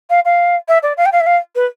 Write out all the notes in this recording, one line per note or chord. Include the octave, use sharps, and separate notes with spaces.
F5
F5
E5
D5
F5
G5
F5
E5
F5
B4